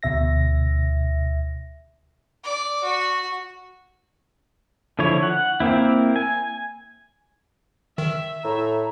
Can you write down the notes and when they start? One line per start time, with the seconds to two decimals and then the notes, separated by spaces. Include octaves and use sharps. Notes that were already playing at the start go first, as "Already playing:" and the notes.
0.03 D2 B2 E5 A#6
2.44 D5 D6
2.84 F#4
4.99 D3 F3 E4 C#5
5.23 F#5
5.60 A#3 C4 E4
6.16 G#5
7.98 D#3 E5
8.44 A2 A#5